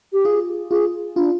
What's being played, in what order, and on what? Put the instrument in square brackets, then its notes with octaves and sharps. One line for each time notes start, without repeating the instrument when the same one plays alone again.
[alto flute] G4
[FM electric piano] F4 [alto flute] G#4
[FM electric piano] F4 [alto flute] G#4
[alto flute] D4 [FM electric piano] F4